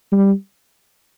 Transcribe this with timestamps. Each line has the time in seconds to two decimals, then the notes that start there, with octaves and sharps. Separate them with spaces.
0.12 G3